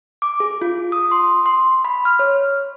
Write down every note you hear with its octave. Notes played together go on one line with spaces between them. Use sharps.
D6
G#4
F4
D#6
C6
C6
B5
F6
C#5